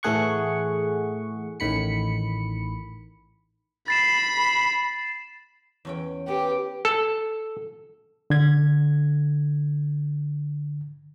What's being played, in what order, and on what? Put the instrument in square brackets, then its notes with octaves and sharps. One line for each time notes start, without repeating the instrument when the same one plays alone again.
[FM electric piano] A2 E3 A3 G#4 F#5 C#6
A1 A2 D#3 B5 C#7
[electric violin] B5 [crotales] A6 C7 E7
[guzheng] E2 C#4 G5
[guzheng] B3 [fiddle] G4
[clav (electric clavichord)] A4
[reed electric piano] D3 G#6